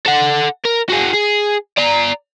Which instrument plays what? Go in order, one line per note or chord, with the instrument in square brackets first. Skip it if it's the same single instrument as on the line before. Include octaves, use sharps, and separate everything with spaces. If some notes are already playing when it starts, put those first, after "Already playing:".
[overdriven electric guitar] A4 F#5
A#4
F#4 G#4
G#4
D5 A#5